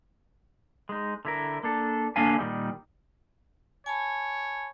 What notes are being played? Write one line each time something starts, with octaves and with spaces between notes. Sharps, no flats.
G#3 D#4
D3 E4 A#4
A#3 D4 A4
D3 A#3 D4 F5 G#5
A#2 D#3 G3 D#4
C#5 G#5 A5 B5